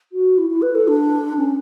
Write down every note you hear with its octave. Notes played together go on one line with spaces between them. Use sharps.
F#4
E4
E4
B4
A4
D4
C#4